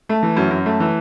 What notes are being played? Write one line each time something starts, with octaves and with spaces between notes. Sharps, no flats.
A3
E3
F#2
F#2
A3
E3